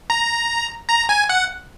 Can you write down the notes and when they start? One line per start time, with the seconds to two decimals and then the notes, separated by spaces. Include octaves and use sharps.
0.10 A#5
0.89 A#5
1.09 G#5
1.29 F#5